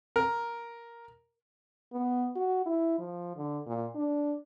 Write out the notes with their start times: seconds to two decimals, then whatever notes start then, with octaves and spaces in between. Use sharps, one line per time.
0.16 A#4
1.93 B3
2.36 F#4
2.66 E4
2.99 F3
3.37 D3
3.67 A#2
3.95 D4